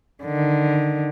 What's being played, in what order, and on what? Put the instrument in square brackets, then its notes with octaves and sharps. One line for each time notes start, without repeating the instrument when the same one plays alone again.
[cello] D3 D#3